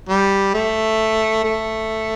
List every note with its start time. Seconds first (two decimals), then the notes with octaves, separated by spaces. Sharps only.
0.09 G3
0.54 A3
1.44 A3